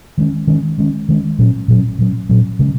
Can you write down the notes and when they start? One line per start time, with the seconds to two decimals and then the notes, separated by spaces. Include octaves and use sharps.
0.18 D#3 G#3 C#4
0.47 D#3 G#3 C#4
0.78 D#3 G#3 C#4
1.09 D#3 G#3 C#4
1.38 A#2 F#3 C#4
1.68 A#2 F#3 C#4
1.98 A#2 F#3 C#4
2.29 A#2 F#3 C#4
2.59 C#3 G#3 C#4